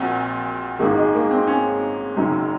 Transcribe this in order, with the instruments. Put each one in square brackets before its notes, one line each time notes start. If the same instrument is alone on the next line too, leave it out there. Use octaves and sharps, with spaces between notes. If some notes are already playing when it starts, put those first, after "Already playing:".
Already playing: [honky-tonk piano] A#1 A#2 F#4 [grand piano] C4
[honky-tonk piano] G#1 G#2 D#3 [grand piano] A#3
[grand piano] G#3
A#3
C4
C#4
[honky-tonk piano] F#1 F#2 D#3